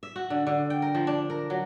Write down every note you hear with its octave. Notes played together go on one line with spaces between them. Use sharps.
E5
F#4
D3
D3
G5
A#4
F3
D4
A#4
F#3